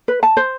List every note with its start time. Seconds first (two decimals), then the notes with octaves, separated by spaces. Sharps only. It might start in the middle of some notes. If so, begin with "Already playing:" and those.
0.08 B4
0.23 A5
0.37 C5